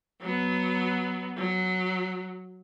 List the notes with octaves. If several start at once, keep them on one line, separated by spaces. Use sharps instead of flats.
F#3 B3
F#3